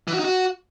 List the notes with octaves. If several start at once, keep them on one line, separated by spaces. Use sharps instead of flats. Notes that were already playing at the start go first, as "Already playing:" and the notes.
E3
F#4
D#4
F#4